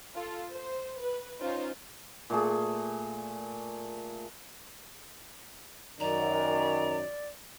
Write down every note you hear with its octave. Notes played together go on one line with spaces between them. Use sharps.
F4 A4
C5
B4
C#4 D#4 F4 C5
A#2 A3 G#4
F#2 D#3 D5 A#5